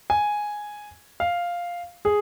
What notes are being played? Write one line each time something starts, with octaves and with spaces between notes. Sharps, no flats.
G#5
F5
G#4